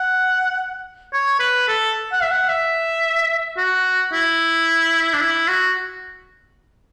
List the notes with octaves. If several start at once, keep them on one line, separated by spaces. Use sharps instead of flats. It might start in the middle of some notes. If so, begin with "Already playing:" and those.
Already playing: F#5
C#5
B4
A4
F#5
E5
F#5
E5
F#4
E4
D4
E4
F#4